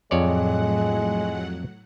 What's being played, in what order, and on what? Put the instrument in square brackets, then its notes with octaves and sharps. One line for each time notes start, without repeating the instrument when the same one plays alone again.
[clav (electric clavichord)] F2 C#5 D5 [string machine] A2 F#3 F#5 [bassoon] G#3